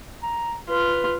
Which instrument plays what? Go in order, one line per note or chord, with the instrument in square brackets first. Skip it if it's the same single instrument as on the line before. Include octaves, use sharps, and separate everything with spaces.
[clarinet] A#5
[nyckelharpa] F4 [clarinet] B4